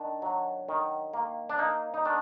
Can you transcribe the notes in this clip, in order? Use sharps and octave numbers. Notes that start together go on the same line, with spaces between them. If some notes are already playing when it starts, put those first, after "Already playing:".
Already playing: D#3 D4
F#3
D#3
A#3
D4
A#3 D#4
D#4
D#3 D4